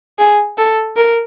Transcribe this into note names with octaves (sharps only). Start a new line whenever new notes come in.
G#4
A4
A#4